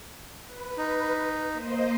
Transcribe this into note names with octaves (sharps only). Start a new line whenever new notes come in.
B4
D#4
A#3 C5 D#5